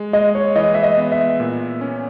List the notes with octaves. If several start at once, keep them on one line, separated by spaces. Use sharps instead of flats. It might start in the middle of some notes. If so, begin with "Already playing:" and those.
Already playing: G#3
G#3 D#5
C#5
E3 D#5
E5
D#5
B3
E5
A#2
C#4